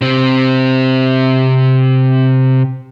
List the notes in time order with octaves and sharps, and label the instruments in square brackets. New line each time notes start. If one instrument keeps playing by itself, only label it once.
[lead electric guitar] C3 C4